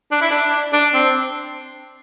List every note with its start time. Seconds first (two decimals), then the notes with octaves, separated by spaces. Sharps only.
0.12 D4
0.21 E4
0.31 D4
0.73 D4
0.94 C4